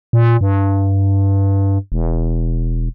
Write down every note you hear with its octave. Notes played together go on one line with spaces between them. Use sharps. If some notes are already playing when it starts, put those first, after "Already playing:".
A#2
G2
E1